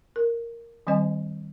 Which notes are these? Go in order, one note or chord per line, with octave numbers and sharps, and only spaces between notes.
A#4
D#3 G3 C4 C5 D#5 G#5